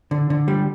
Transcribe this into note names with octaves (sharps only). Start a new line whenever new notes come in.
D3
D3
G3